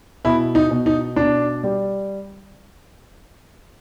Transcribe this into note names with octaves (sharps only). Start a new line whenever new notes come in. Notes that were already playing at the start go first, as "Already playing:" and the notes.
B2 E4
D#4
B2
D#4
B2 D4
G3